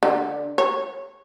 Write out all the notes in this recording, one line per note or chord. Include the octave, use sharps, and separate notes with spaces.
D3
C#5